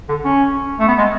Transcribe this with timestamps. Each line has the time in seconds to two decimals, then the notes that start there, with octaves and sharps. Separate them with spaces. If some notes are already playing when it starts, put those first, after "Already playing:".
0.09 D3
0.25 C#4
0.80 A3
0.88 B3
0.98 G#3